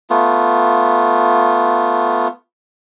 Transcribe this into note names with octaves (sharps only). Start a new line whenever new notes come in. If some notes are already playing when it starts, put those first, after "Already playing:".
A3 B3 F4